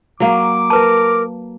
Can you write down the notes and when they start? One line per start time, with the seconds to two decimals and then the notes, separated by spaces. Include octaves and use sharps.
0.20 F#3 A#3 D6
0.70 A#4 B4 A5